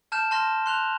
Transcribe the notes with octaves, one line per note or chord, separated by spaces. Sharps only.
A5 F6 G6 E7
A5 C6 F6 A#6
C6 F#6 F7